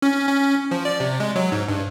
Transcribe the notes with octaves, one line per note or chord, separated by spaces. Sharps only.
C#4
C#4
F3
D5
C3
G#3
F#3
G#2
G2